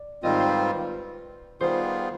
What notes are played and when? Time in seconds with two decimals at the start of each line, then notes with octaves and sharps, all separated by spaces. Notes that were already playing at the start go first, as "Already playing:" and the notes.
Already playing: D5
0.23 G#2 D#3 G3 C4 F4 D#5
0.31 D5
0.40 C5
0.48 B4 D5
1.61 D#3 G3 B3 F4 G#4 C5